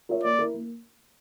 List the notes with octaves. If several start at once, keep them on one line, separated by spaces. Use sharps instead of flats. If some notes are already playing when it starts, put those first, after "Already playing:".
F4 A#4 C#5 E5
A#3 D5
E4 A#4
A#3